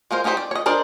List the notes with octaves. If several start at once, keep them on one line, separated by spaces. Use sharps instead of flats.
G#3 F4 A#4 C5
C#4 D#4 E4 G4 C5
D5
C#5 D#5
D4 A#4 C5 D5 D#5